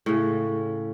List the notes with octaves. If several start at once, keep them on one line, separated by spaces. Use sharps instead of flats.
A2 C#3